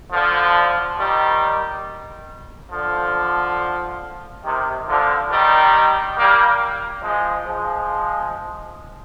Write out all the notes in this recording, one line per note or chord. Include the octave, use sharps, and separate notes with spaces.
D3 F3
D#3 G3
D3 F3
C3 D#3
D3 F3
D#3 G3
G3 A#3
F3 G#3
F3 G#3